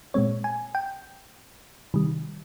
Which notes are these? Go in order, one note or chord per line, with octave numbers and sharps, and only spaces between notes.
A#2 G#3 C4 C#5
G#5
G5
C3 D#3 G3